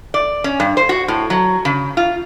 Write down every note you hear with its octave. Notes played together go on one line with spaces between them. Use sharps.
D5
C#4
G2
C5
F#4
A2
F#3
C#3
F4